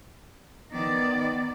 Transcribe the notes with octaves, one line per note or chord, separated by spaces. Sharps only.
D#3 B3 D5